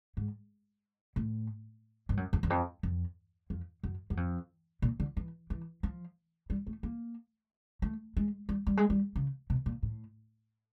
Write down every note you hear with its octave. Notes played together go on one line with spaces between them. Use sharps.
G#2
A2
G2
F#2
F2
E2
F2
F2
F2
F#2
F#2
F2
A#2
D3
E3
E3
F3
G3
A3
A#3
A3
G#3
G3
G3
G#3
G3
C#3
B2
A#2
A2